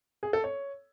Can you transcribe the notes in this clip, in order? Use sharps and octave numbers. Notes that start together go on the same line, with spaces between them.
G#4
A4
C#5